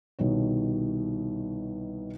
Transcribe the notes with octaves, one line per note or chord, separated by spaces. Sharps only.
C2 B2 D#3 C#5